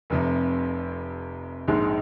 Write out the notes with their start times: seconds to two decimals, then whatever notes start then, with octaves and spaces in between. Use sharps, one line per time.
0.10 F1 F2 C3
1.68 A#1 G#2 G#3